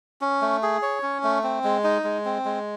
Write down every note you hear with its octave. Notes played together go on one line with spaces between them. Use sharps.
C#4
A3
G#4
C#5
C#4
A3
C4
G#3
D#4
G#3
C4
G#3